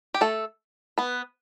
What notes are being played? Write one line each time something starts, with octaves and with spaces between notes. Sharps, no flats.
G4
A3 A4
B3 B4